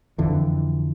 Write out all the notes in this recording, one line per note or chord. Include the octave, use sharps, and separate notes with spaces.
F2 D3 E3